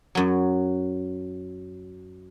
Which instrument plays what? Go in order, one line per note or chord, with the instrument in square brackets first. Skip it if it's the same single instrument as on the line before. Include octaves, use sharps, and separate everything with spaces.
[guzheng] F#2 F#3